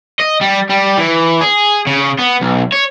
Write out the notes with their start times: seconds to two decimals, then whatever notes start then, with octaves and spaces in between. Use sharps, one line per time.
0.20 D#5
0.41 G3
0.69 G3
0.98 E3
1.41 G#4
1.87 C#3
2.19 B3
2.42 B1
2.72 C#5